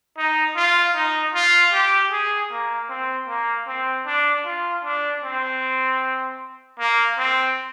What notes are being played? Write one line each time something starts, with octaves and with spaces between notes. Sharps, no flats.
D#4
F4
D#4
F4
G4
G#4
A#3
C4
A#3
C4
D4
F4
D4
C4
A#3
C4